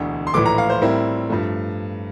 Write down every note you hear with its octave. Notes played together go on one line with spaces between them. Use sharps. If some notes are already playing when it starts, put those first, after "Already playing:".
Already playing: E1 D2 D3
C6
A#1 A2 E3 A3 D6
A#5
F5
C5
A2 G3 C4 E4 A#4
G2 F3 A3